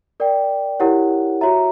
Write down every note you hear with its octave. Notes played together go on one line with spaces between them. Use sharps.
A#4 D5 G5
E4 G4 A#4 C#5 F#5
F#4 C#5 E5 A#5